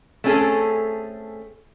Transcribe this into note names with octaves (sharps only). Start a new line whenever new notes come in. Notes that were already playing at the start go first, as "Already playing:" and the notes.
A3 C4 C#4 G#4 A4